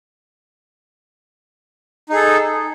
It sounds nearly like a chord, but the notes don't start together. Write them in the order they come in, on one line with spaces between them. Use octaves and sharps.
D#4 G#4 A4